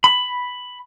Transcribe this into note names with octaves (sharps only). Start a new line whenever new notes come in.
B5